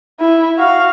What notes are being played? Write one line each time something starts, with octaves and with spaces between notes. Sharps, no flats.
E4
F#4 F5